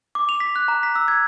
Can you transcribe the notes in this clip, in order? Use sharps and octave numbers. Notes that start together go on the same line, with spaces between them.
D6
F7
B6
F#6
A#5
B6
E6
G#6